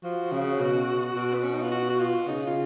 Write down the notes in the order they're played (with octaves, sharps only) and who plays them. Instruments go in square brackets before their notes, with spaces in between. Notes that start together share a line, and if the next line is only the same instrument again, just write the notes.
[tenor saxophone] F3 [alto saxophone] F#4
[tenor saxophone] C#3
B2
B2
[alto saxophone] B3
C#4
D#4
F4
F#4
F#4
F4
[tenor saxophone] C#3 [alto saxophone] D#4
[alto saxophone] F4